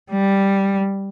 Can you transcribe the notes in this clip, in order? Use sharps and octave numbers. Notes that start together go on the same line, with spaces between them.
G3